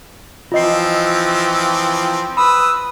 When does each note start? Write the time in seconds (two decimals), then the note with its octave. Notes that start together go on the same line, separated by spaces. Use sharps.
0.52 E3 F3 C4 F4 D#5 C7
2.37 B4 B5 D#6 E6